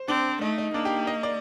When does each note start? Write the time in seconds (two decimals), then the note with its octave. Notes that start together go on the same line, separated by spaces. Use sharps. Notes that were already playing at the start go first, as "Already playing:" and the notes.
Already playing: C5
0.08 C4 D4
0.41 A3 D#4
0.58 D#4
0.74 A#3 D4
0.85 G4
1.07 D#5
1.23 D5